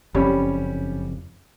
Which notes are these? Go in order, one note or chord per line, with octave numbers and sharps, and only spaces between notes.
F#1 F2 G3 C#4 B5